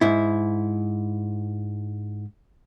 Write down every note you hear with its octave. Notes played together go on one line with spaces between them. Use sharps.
G#2 E4